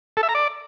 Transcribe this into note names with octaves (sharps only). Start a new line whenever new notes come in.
A4
E5
A#5
D5